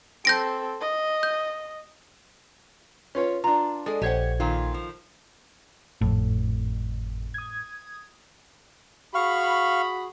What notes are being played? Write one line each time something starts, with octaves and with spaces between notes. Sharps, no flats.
C4 A4 G6 A#6 D7
D#5
G6
C#4 F4 B4 C#5
D4 F4 A#5
G#3 G#4 A4 D5
A#1 G4 C5 C#5 D#5 F#5 G#6
A#2 D#3 F4
F3
G#1 F2 A2
D#6 G#6
F#4 G#4 F5 B5 C#6